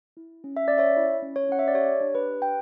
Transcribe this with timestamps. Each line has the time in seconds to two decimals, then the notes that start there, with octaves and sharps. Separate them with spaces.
0.17 E4
0.44 C#4
0.57 E5
0.68 C#4 D5
0.78 C#5 E5
0.97 E4
1.22 C#4
1.36 C#5
1.49 C#4 F#5
1.59 E5
1.68 D5
1.74 G4 C#5
2.01 D4
2.15 B4
2.28 G4
2.42 G5